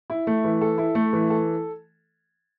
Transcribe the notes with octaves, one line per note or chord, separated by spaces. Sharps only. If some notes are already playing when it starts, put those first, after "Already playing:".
E4
A3
E3
A4
E4
A3
E3
A4